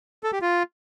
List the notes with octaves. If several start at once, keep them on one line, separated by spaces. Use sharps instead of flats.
A4
G4
F4